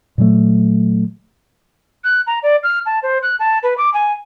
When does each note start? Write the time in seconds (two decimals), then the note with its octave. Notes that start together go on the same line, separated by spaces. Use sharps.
0.18 A#2 E3 F#3 A3
2.04 F#6
2.27 A#5
2.43 D5
2.63 F6
2.86 A5
3.03 C5
3.23 F#6
3.39 A5
3.63 B4
3.78 D6
3.94 G#5